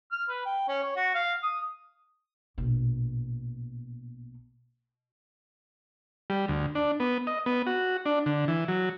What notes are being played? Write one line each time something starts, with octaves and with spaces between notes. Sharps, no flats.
F6
B4
G5
C#4
C#5
F#4
F5
D#6
A#1 B2
G3
D2
D4
B3
D#5
B3
F#4
D4
D3
E3
F#3